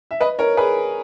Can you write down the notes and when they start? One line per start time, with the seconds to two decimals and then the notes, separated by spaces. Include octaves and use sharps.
0.11 E5
0.21 B4 D#5
0.39 A#4 C#5
0.57 G#4 B4